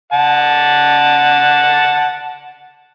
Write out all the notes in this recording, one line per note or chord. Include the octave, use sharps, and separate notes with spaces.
F#5 A5